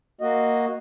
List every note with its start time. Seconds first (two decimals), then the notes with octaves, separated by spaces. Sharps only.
0.21 A#3 F#4 D#5